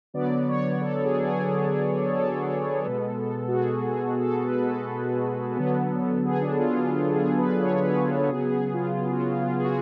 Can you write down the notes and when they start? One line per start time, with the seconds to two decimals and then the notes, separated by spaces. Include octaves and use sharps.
0.14 D3 F#3 B3 D5
0.48 C#5
0.82 A4
1.05 G#4
1.28 G#4
2.17 A4
2.85 B2 G#3 B3
3.48 F#4
3.53 G#4
3.88 G#4
4.21 A4
4.44 B4
4.67 A4
5.57 D3 F#3 B3
6.25 G#4
6.41 D4
6.59 F4
6.76 F4
6.93 F4
7.15 G#4
7.38 B4
7.61 C#5
7.84 B4
8.06 A4
8.28 C#3 F#3 B3 G#4
8.51 G#4
8.73 F4
8.97 F4
9.09 F#4
9.20 F4
9.42 F4
9.59 G#4
9.65 F#4